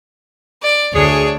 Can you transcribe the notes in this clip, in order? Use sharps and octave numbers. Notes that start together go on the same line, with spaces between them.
D5
D2 D4 G#4 C#5